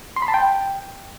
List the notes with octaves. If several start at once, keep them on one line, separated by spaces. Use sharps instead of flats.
C6
B5
A5
G5